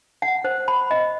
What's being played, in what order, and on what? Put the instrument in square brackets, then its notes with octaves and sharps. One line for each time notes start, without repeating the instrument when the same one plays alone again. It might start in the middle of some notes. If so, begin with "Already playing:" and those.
[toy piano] F#5
C5
B5
D#5